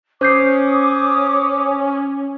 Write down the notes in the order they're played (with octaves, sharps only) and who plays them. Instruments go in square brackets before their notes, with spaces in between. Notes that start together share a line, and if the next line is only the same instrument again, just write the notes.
[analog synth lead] C#4 [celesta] C5 G6 C7 [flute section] D6 D#6